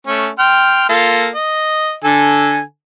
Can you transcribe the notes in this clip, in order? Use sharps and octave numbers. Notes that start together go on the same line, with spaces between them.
A3 C#4
G5 C6 F6
A#3 F4 A4
D#5
D3 A4 G#5